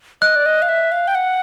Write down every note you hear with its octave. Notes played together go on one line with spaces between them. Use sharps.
D#5 F#6
D5
D#5
F5
E5
F5
G5
F#5